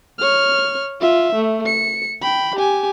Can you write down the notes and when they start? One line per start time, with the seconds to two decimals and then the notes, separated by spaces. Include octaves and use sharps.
0.19 C#5 F6
1.01 F4 E5
1.36 A3
1.66 C#7
2.22 G5 B5
2.56 G4 G#5